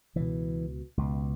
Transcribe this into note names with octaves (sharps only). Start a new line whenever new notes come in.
C#2 B2 E3
C#2 B2